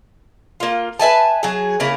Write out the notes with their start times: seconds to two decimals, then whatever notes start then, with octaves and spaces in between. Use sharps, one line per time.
0.60 A#3 F4
1.00 B4 E5 G#5 A5
1.43 F#3 G#4
1.80 C#3 A#3 E4